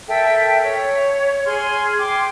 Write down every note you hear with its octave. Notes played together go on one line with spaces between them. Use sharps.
A4 A#4 E5 G5
C#5
G#4 C6 F6 G#6
G5 C6 D6